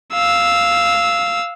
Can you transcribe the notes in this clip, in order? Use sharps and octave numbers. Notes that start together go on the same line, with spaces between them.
F5 E6